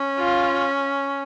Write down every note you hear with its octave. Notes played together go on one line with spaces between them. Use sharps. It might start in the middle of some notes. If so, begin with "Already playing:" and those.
Already playing: C#4
F4